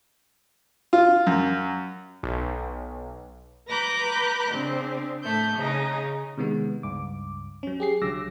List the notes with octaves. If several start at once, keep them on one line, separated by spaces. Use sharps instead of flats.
F4
F#2
B1
B4 A#5 B5 D6 F#6 G6
C#3 C4 D4
A2 A3 G6
C#3 D#4
C3 D#3 G#3 B3
C#2 G2 D6
F#3 C#4
G4 G#4 C7
C2 D3 F#3 D6 E6 A#6